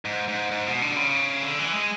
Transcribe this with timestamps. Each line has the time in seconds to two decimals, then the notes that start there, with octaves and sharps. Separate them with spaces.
0.05 G#2
0.28 G#2
0.51 G#2
0.67 B2
0.82 D3
0.96 C#3
1.43 D3
1.59 E3
1.74 G#3